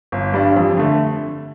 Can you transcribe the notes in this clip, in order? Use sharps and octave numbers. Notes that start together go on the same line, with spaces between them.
G1
G2 G3 D4
F2
D3 A3